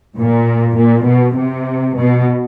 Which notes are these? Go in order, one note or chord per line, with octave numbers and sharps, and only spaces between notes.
A#2
A#2
B2
C3
B2